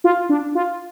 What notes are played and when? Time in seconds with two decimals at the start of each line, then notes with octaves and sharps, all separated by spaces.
0.04 F4
0.29 D4
0.55 F4